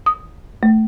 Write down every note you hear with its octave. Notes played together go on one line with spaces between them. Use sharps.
D#6
A3